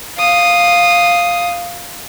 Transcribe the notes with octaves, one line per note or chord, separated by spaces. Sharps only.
F5 D#6